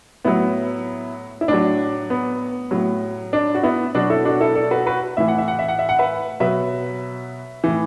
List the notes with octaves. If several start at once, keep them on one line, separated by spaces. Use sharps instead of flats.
A2 F#3 B3 E4
E4
A2 F#3 D4
B3
A2 F#3
D4
F#4
B3 E4
B2 F#3 D4 F#4
E4 A4
D4 F#4
E4 A4
A4 D5
F#4 B4
F#4 B4
A2 E3 E5
F#5
E5
F#5
E5
F#5
E5
F#5
B4 E5
B2 F#3 B4 E5
A2 E3